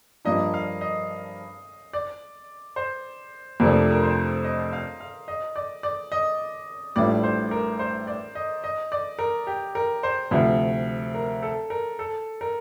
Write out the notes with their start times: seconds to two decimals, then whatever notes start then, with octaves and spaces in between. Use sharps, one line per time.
0.25 G2 F3 A#3 D4 D#5
0.54 F5
0.81 D#5
1.93 D5
2.76 C5
3.60 F2 C3 F3 A3 D4 A#4
3.91 A#4
4.03 C5
4.44 D#5
4.73 F5
5.00 F5
5.28 D#5
5.56 D5
5.83 D5
6.12 D#5
6.96 A1 A2 G3 D4 F4 D5
7.23 C5
7.51 A#4
7.79 C5
8.07 D5
8.35 D#5
8.64 D#5
8.92 D5
9.19 A#4
9.47 G4
9.75 A#4
10.03 C5
10.31 D2 C3 F3
11.15 A#4
11.42 A4
11.70 A#4
11.99 A4
12.41 A#4